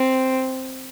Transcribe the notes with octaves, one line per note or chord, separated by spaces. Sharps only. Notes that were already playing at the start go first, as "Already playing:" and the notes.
Already playing: C4